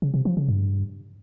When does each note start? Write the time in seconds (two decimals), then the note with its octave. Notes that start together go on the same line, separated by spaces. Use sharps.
0.02 C#3
0.14 C3
0.25 F3
0.37 C#3
0.49 G2